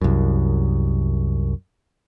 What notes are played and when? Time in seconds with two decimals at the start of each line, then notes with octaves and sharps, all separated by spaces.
0.01 C2 F#2